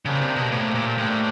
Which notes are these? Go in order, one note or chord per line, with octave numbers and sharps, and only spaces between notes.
C#3 A#3 D4 G4 C5
C3
B2
A2 A#3 D4 G4 C5
A#2
A2 A#3 D4 G4 C5